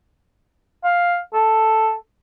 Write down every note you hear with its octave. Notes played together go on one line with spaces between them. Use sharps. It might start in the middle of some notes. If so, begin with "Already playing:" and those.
F5
A4